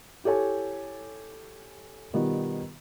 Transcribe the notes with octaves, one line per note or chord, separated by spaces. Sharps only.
E4 G4 A4 C#5 G#5
B2 D#3 G3 B3 F4